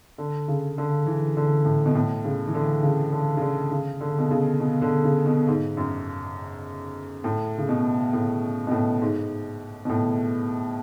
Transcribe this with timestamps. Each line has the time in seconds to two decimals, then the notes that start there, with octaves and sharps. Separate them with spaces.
0.18 D3
0.48 C#3
0.78 D3
1.06 E3
1.37 D3
1.65 A2
1.86 B2
1.95 A2
2.25 C#3
2.47 E3
2.54 D3
2.83 C#3
3.12 D3
3.37 C#3
3.41 D3
3.71 C#3
4.01 D3
4.19 B2
4.31 C#3
4.60 B2
4.82 D3
5.04 C#3
5.26 B2
5.47 G#2
5.77 F#2
7.24 A2
7.58 C#3
7.69 B2
8.13 A2
8.67 B2
8.71 A2
9.01 G#2
9.85 B2
9.90 A2